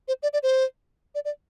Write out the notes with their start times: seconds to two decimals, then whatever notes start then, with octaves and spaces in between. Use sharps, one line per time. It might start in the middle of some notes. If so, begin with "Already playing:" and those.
0.08 C5
0.23 D5
0.33 D5
0.43 C5
1.15 D5
1.25 D5